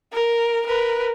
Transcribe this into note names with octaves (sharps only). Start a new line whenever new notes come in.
A#4
A#4 B4